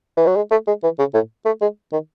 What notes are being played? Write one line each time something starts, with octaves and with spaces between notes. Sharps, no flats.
E3
F#3
G#3
A3
G#3
E3
C#3
A2
A3
G#3
D#3